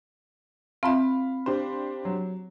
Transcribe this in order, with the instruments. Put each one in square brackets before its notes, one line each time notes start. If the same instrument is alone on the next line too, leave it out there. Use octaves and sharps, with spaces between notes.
[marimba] C4 F4 E5 [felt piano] F5 B5
[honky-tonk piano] D4 G4 C5
[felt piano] F#3